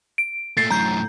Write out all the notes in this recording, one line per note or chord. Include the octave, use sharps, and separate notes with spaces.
D7
A#2 A3 A6 C7
F#2 A2 A#5 G6